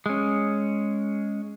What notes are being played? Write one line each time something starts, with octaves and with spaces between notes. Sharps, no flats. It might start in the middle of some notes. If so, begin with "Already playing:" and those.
G#3 C#4